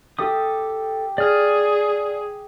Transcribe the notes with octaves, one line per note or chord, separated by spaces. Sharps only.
G4 A4 D#6
G#4 D5 F6